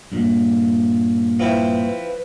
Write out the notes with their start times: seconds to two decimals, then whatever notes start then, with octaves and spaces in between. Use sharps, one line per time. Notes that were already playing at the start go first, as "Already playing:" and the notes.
0.12 G2 A#2
1.40 F3 C4 E4 B4